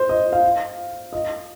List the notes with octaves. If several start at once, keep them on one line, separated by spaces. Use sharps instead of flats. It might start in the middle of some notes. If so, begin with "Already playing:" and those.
Already playing: C5
D#5
F5
D#5